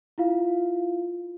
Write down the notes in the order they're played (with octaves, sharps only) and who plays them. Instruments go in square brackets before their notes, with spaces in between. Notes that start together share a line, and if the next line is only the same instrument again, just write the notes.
[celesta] E4 F4 F5